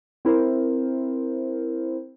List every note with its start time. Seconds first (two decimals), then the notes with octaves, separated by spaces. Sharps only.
0.25 C4 E4 A#4 C5